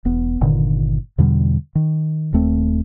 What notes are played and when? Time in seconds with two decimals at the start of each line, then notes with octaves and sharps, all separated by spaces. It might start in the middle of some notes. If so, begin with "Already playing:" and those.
0.05 E1 B3
0.41 G1 A#2 D3 D#3
1.18 E2 B2 D3 G3
1.75 D#3
2.33 D#1 D#2 A3 C4